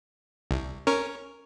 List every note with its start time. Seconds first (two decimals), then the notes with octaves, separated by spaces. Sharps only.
0.51 C2
0.87 C#4 A#4 C#5